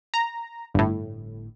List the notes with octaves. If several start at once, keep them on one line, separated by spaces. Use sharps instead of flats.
A#5
G1 A2